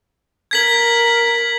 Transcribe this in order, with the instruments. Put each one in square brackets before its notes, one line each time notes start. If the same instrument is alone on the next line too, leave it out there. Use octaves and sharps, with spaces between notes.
[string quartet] A#4 [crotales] G#6 B6 F#7